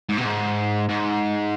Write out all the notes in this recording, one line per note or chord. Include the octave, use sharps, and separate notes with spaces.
G#2
B2
G#2
G#2